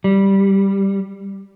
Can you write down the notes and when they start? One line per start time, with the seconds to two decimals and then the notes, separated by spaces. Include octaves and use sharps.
0.04 G3